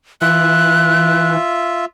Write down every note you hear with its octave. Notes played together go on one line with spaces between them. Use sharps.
E3 F4 E5 F#6